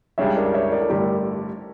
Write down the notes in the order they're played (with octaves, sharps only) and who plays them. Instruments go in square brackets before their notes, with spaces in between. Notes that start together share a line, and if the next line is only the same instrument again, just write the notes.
[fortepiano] C#2 C#3 G3 D4 [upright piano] C#5 E5
[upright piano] A#4 D5
C#5 E5
A#4 D5
A4
[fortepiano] A1 G2 D3 A3 [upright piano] G4 A#4